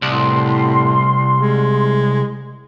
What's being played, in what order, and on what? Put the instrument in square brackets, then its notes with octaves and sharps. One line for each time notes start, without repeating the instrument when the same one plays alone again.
[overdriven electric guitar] C2 [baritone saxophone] A2 [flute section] C6
[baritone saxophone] G#3